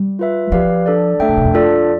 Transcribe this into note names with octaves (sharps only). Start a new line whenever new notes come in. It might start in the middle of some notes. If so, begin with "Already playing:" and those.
Already playing: G3
F4 B4 E5
F3 G4 B4 D5 F5
D4 A4 D5
D3 A3 D4 A4 E5 G5
C3
E2 B2
F2
D4 F4 A4 D5